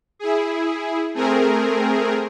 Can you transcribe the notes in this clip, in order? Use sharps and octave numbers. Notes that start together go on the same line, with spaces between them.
E4 G#4
A3 C4 G#4 A#4